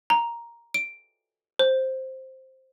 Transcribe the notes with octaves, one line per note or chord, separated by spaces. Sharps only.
A#5
D7
C5